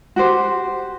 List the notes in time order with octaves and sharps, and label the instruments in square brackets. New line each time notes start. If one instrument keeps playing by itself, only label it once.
[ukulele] F#4 G4 C5